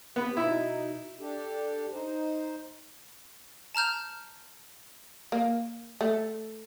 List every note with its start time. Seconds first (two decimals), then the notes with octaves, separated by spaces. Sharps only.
0.16 B3 G4
0.37 B2 D#4 E4
1.19 D4 G4 A4
1.91 D#4 C5
3.75 A5 A#5 F6 G6
5.32 A#3
6.01 A3